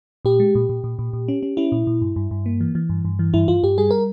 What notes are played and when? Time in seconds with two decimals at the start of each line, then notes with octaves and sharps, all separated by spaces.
0.25 A#2 G4
0.40 G#3
0.55 A#2
0.69 A#2
0.84 A#2
0.99 A#2
1.13 A#2
1.28 C#4
1.43 C#4
1.57 C#4 E4
1.72 A#2
1.87 A#2
2.01 G2
2.16 G2
2.31 G2
2.46 A#3
2.61 E3
2.75 E3
2.89 G2
3.05 G2
3.19 E3
3.34 G2 E4
3.48 G2 F4
3.63 G2 G4
3.78 G3 G#4
3.91 A#4